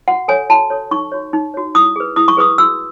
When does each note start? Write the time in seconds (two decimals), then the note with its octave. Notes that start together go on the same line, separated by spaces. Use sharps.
0.08 F#4 F#5
0.28 A4 C#5 G#5
0.50 F#4 A5
0.70 A4 C#5
0.91 D#4 C#6
1.12 F#4 C#5
1.33 D#4
1.54 F#4 C#5
1.75 E4 D#6
1.96 G#4 B4
2.16 E4 D#6
2.28 C#6
2.37 G#4 B4 D#6
2.58 F#4 E6